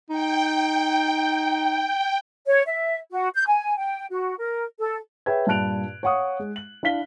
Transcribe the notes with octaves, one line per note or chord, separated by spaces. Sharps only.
D#4 G5
C#5
E5
F#4
G6
G#5
G5
F#4
A#4
A4
G#4 B4 C#5 E5 G5 G#6
G2 A#2 A5 F#6 D7 F7
C#5 F5 F#5 C#6 D#6
G#3
F#7
D4 E4 F5 B6 G7